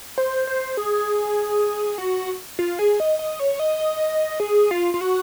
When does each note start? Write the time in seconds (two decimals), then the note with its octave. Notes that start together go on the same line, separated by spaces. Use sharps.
0.18 C5
0.47 C5
0.77 G#4
1.98 F#4
2.59 F4
2.79 G#4
3.00 D#5
3.19 D#5
3.40 C#5
3.59 D#5
4.40 G#4
4.71 F4
4.94 F4
5.01 F#4